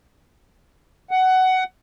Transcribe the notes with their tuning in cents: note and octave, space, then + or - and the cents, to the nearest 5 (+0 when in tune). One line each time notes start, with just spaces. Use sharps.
F#5 +15